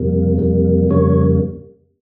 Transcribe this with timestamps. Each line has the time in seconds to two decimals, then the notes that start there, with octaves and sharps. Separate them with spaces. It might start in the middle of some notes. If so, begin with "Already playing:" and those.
Already playing: F2 C3 G3 A#3
0.38 F2 C3 G3 A#3
0.89 F2 C#3 G3 A#3 C#5